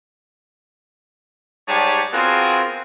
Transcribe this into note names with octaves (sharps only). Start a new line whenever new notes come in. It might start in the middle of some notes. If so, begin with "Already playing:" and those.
G#2 G3 G4 G#4 C#5 A5
B3 C4 F4 F#4 G#4 A#4